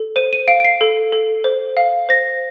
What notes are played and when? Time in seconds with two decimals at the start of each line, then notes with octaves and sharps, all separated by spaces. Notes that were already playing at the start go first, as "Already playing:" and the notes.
Already playing: A4
0.16 C5 D#7
0.33 D#7
0.48 F5 D7
0.60 D7
0.65 C7
0.81 A4
1.12 A4
1.44 C5
1.77 F5
2.09 C5 A#6